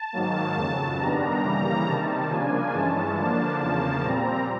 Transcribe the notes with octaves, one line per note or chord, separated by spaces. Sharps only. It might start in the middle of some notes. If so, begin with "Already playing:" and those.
Already playing: A5
G#2 D#3 F#3 A#3
F2 C#3 F#3
G2 D#3 G3 B3 D4 A#5
C#3 E3 G3 A#3
C3 D#3 G3 A5
C#3 F3 A#3 D4 G#5
G2 E3 G#3 C#4 A5
D3 F3 A#3 D4 A5
E2 C#3 F3 A#3 A5
A#2 G3 C4 A#5